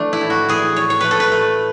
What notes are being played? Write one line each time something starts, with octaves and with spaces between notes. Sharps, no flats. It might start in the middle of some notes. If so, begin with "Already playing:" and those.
Already playing: E3 A3 D4
E4
A2
F#4
E3 G#4
A2 C#5
C#5
A3 B4
A4
B4
A3